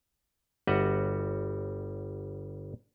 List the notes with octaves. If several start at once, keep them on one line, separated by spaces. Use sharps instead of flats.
G1 G3 F#4 D#5 E5 F#5